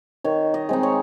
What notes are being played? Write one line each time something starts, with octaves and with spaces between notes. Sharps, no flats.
D#3 C#5
D#5
G#3 C4 D#4
C#5